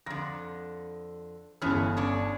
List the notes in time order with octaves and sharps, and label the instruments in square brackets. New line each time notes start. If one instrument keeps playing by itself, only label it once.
[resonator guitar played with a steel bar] F2 D3 [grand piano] A#6
[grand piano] G1 A5 F6 [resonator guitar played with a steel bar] E3 G#3 C#4
[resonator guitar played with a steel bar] C#4 D4 C#5